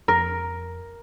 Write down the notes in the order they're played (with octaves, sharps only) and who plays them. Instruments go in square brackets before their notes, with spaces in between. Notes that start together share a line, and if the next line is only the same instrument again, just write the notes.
[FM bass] F2 [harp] A#4